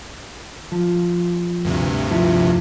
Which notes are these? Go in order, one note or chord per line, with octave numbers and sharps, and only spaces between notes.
F3
D2 G2 C3
F3 E4